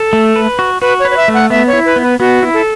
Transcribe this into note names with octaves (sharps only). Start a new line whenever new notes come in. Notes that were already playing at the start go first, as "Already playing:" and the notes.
Already playing: A4
A3
B4
F#4
F#4 B4
C#5
B4
C#5
E5
A3
F#5
B3 E5
C#5
E4
B4
B3
B4
B3 F#4
E4
A4